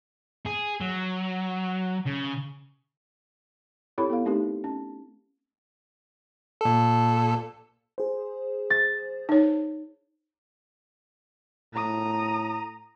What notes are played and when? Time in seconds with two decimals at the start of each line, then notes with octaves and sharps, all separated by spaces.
0.46 G#4
0.80 F#3
2.06 C#3
3.98 C4 E4 G4 A4 C#5 B5
4.10 B3 A4 F5
4.25 A3 C4 D#4 G4 A#4
4.64 C#4
6.61 A#2 A4
7.98 G#4 C5
8.70 A6
9.29 D#4 C#5
11.73 A2 A#5 D#6